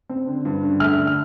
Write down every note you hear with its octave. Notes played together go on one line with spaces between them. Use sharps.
C4
D3
G2
D3
A3 F6
D3
F6